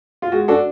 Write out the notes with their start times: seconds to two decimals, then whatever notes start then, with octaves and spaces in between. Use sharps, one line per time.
0.22 F4
0.32 G#3 F#4
0.48 D4 F#4 A4